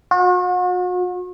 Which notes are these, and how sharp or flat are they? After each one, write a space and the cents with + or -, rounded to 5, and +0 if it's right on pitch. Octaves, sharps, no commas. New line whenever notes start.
F#4 -40